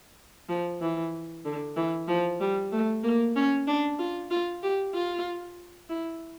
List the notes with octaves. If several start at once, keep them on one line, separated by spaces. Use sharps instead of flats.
F3
E3
D3
E3
F3
G3
A3
A#3
C#4
D4
F4
F4
G4
F4
E4